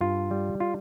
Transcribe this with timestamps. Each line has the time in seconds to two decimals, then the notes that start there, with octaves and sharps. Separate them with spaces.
0.01 G2 F4
0.31 G3
0.60 F4